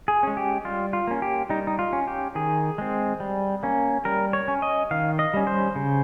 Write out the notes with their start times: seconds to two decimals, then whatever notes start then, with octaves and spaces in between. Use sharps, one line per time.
0.08 G#4
0.23 G#3 C#4
0.37 G4
0.65 G3 F4
0.93 F4
1.07 A#3 C#4
1.22 G4
1.49 G3 D#4
1.67 D#4
1.79 F4
1.93 C#4
2.07 G4
2.35 D#3 G#4
2.78 G#3 C4
3.20 G3
3.63 A#3 C#4
4.05 G3 A#4
4.33 C#5
4.48 C#4
4.62 D#5
4.91 D#3 F5
5.19 D#5
5.34 G3 C#4
5.47 C5
5.76 C#3